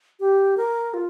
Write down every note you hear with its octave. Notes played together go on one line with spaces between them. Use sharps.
G4
A#4
F4